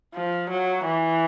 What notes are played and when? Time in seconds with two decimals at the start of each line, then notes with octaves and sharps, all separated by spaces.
0.14 F3
0.50 F#3
0.85 E3